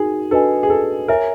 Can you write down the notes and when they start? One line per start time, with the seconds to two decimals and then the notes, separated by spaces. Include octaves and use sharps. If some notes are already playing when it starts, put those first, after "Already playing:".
Already playing: D#4 F#4 G#4 A#4
0.31 D4 F#4 A4 B4 D#5 G#5
0.63 G#4
0.70 A4
1.08 A#4 C#5 E5 G#5